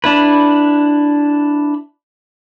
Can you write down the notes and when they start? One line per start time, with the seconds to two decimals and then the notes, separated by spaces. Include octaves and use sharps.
0.04 D4 E4 B4